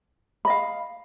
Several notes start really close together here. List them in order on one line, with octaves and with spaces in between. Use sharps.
B5 D#5 F5